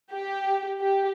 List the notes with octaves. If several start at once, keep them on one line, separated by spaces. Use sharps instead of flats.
G4
G4